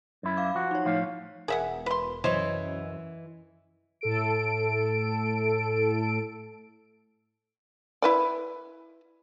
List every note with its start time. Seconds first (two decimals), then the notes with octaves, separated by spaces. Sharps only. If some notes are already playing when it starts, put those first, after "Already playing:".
0.23 F#2 E4
0.37 F5 D6
0.55 F3 F#4
0.71 D#4 C#5
0.85 A2 F3 F5
1.48 E1 G#4 A#4 E5 F#5
1.86 B4 C6
2.24 C2 F#2 E3 C5 C#5 D#5 G#6
4.01 A2 A4 D7
8.02 E4 B4 D5